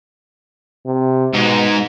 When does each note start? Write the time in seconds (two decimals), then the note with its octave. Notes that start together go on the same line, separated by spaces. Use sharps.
0.86 C3
1.34 G#2 B2 D#4